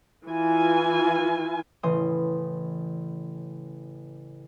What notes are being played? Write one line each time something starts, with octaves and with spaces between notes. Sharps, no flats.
E3 F4 G#5
A1 C#3 E3 C6 D#6